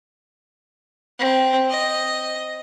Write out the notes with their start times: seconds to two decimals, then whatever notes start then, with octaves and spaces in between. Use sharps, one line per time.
1.19 C4
1.70 D#5